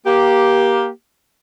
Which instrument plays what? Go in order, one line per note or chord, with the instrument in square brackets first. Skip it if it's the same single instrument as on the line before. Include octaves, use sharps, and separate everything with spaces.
[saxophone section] A#3 G4